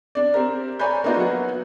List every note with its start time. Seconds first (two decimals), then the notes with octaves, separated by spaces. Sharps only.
0.15 D4 D5
0.34 C4 G4 A#4
0.79 C#5 D5 G#5 A#5 B5 G6
1.04 A#3 B3 D4 D#4 F4 F#4
1.17 F#3 B3 F#5